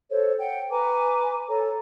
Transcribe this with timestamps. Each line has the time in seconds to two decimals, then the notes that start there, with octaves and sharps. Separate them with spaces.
0.10 A4 C5 C#5
0.40 F#5 G5
0.71 B4 G#5 A#5 D6
1.48 A4 C#5 A#5